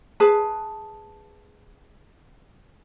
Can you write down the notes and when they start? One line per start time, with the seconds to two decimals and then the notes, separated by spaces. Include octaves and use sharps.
0.20 G#4 B4 A5